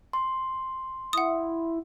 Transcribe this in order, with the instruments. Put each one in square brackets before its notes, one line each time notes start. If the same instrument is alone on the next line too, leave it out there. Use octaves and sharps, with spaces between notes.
[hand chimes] C6
[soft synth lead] E4 [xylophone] F#5 D#6